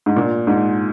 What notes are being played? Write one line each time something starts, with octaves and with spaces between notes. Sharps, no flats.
G#2
A#2
G#2